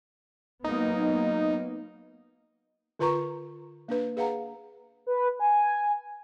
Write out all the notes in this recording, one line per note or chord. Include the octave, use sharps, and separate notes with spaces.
F#3 A#3 B3 D#4
D3 F4 B4 A#5 C#6
A#3 D4 B4
G#4 B4 F5 F#5 A#5
B4
G#5